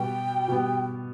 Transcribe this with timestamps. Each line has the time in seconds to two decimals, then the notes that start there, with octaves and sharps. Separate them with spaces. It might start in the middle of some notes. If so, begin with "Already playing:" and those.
Already playing: B2 G3 B3 G5
0.48 B2 G3 B3